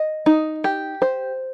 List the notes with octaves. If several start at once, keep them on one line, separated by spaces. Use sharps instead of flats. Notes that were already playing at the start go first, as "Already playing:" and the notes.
Already playing: D#5
D#4
G4
C5